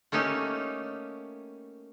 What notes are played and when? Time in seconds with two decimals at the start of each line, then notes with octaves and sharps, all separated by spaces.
0.12 A3 A#3 C#4 D#4 G4